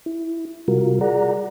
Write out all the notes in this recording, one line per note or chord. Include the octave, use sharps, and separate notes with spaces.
E4
C3 G3 F4 F#4 A#4
G#4 D5 F#5 A#5